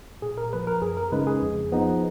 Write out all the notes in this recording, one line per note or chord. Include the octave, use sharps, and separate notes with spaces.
A#2 G#4
A#4
F3 A#3 B4
A#4
F#2 G#4
A#4
C#3 G#3 D#4 B4
G#4
F2
F3 B3 D#4